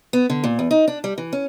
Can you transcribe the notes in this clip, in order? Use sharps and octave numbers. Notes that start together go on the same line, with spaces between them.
B3
D3
A#2
E2
D#4
D4
G3
E3
C#4